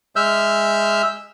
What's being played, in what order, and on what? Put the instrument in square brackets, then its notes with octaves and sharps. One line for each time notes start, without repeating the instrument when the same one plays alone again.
[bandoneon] G#3 E5 E6 F6 G6